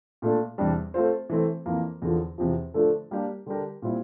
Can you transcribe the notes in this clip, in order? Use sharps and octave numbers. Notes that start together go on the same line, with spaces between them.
A#2 A3 D4
E2 C3 G3 D4
A3 C4 F4 C5
E3 A3 C4
F2 E3 A#3
E2 D3 F3
E2 C3 F3
D3 F3 A3 D4 A4
G3 A#3 D4 G4
D3 G3 D4 G4 A#4
A#2 G3 C4 E4 G4